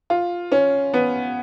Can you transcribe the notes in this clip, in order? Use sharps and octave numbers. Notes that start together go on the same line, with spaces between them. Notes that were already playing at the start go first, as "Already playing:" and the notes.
F4
C#4
B3